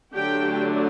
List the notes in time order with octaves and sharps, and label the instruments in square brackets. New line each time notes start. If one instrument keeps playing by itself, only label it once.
[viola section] D3 F#3 A3 D4 G4 G5